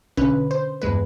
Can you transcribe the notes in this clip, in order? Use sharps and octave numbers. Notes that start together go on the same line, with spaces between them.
B1 D3 C#4 B4
C5
E2 G2 G#3 B4